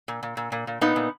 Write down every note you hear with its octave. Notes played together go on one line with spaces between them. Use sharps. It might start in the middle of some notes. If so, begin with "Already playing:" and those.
A#2
A#2
A#2
A#2
A#2
A#2 B3 D#4
A#2